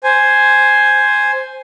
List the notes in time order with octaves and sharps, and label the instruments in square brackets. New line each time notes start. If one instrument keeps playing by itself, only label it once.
[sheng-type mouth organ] C5 G#5